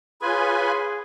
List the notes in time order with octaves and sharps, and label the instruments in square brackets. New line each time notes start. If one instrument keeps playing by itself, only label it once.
[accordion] F4 B4 G#5 [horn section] G#4 [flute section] C#5 B5 C6